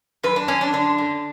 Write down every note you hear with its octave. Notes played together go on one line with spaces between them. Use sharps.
F#2 B4
D4
F#2 C#4
D4
D3 D4
D3